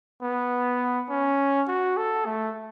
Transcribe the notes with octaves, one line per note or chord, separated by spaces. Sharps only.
B3
C#4
F#4
A4
A3